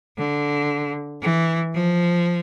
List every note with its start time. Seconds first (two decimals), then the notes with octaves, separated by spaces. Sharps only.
0.18 D3
1.22 E3
1.74 F3